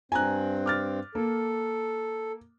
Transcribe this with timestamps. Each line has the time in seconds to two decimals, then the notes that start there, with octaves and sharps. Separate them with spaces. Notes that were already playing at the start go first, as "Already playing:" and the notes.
0.12 G2 C4 G#5 A#5 F#6
0.66 D6 F6 A6
1.15 A#3 A4